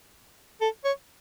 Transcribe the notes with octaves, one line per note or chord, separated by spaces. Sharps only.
A4
C#5